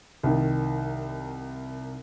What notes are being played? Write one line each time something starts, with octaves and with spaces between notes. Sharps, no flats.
C2 D#3